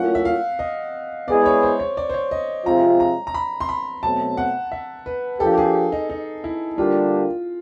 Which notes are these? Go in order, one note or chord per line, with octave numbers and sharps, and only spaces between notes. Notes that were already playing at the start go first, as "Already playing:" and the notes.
Already playing: A2 F#3 A#3 C#4 F4 F#5
E5
F5
D#5
G#3 B3 E4 G#4 D5
C#5
C5
C#5
D5
C5
C#5
D#5
C3 F3 G#3 C4 F4 A#5
A#5
A#5
B5
C6
B5
B2 F#3 A3 C4 A5
F#5
E5
B4
F3 A#3 D4 G4 A4
G#4
D#4
D#4
E4
D3 G3 A#3 D4 F4 G4